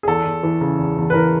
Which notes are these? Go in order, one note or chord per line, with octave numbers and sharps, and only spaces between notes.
G#4
E2 A4
E2
E3
C#3
E2
E2
B4
E3 A#4